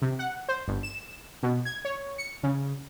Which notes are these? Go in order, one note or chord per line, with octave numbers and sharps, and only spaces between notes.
C3
F#5
C5
G1
E7
B2
G#6
C#5
C#7
C#3